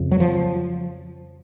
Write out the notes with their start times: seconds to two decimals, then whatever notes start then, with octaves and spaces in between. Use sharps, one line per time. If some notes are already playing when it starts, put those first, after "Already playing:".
Already playing: F2 C#3
0.11 F#3
0.20 F3